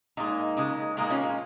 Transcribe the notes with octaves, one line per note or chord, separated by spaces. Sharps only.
A#2 G#3 A#3 D#4
C#3 G#3
A#2 G#3 A#3 D#4
C#4 F4
C#4